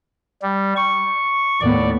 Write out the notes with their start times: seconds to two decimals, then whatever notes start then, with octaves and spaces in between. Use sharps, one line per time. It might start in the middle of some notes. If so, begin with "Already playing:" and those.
0.42 G3
0.77 C#6
1.61 D#2 A2 B3 D5